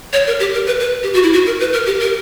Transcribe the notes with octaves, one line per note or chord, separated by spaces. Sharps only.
C#5
A#4
G4
A#4
B4
B4
G4
F#4
E4
F#4
A#4
B4
A#4
G4
A#4